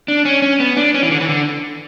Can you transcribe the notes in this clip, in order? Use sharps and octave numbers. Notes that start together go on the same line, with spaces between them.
D4
C#4
C#4
B3
D4
C#4
E3
D3
E3
D3